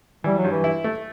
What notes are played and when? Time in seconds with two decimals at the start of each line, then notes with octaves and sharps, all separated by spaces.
0.24 E3 G3
0.38 F#3
0.44 G2
0.51 E3
0.64 E4
0.84 A3